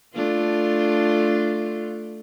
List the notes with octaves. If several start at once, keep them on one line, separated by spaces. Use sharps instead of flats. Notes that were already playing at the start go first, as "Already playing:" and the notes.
A3 D4 F4